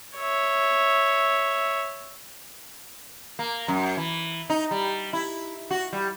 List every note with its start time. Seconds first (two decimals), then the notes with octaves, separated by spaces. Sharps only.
0.18 C#5 E5
3.39 A#3
3.68 F#2
3.97 E3
4.50 D#4
4.71 G3
5.13 E4
5.71 F#4
5.93 G3